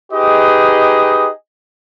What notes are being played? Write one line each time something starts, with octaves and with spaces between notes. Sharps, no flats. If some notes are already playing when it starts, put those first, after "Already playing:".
D#4 G4 G#4 B4 D#5